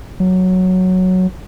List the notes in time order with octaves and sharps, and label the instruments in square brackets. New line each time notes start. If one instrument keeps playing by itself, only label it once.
[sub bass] F#3